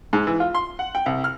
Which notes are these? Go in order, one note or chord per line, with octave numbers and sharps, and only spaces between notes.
G#2
E3
F4
C6
F#5
G5
C2
F6